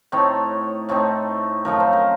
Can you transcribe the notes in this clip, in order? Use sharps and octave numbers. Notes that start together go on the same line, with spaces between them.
A2 A3 C4 D#4 C#5
A2 A3 C4 D#4
F#2 F3 A3 D#4 A#4
C5
A#4